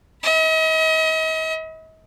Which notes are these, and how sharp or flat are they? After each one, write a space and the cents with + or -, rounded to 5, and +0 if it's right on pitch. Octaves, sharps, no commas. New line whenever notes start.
D#5 +40 B5 +0